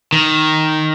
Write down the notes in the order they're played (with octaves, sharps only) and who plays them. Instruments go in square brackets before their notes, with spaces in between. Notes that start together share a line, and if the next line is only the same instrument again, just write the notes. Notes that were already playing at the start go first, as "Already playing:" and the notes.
[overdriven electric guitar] D#3